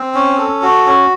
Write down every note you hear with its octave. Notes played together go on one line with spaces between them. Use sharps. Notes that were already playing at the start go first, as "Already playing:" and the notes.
Already playing: C4
C#4
A4
F#4
C#4